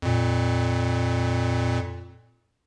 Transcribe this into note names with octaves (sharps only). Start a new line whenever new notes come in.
F2 A#2